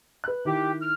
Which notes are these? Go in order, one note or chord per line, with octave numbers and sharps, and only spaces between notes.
B4 F#6
D#3 E4 G4
F6